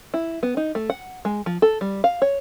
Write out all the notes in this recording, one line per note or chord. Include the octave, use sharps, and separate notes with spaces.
E4
B3
D#4
A3
F#5
G#3
F3
A4
G3
F5
C#5